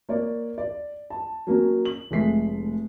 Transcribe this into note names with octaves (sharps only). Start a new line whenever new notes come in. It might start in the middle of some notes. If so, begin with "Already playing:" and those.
A#3 C#5 D5
D5
A5
F#3 A#3 C#4
F#7
F1 G#3 A3 B6 C7